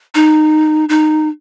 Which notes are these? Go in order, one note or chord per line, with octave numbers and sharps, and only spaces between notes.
D#4
D#4